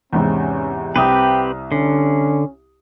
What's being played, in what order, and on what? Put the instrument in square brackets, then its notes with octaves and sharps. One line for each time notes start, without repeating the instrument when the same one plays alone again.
[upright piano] E2 G#2 C3 [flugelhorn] C#4
[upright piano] C2 D#6 [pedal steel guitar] C4 G4 B4 [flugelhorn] G5
[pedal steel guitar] D3 [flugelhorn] C#4